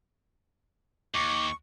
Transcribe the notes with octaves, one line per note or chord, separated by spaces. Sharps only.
D#2 C#6 D6